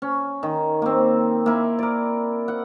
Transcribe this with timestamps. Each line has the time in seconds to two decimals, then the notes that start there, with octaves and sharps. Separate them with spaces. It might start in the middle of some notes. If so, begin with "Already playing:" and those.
0.02 C#4
0.43 D#3
0.82 A#3 C4
1.46 A#3 E4
1.79 A#4 D5
2.48 F#5